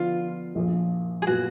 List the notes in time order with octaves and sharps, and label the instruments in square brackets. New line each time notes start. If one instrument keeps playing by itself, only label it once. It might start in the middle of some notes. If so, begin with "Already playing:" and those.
Already playing: [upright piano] D3 F3 B3 D4 [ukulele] F4
[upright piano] A#1 A#2 F3
[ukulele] G#4
[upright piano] A#2 F#3 B3 [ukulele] F#4